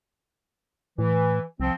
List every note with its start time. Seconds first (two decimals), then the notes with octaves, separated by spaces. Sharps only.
0.99 A2 E3
1.60 C2 F3 C4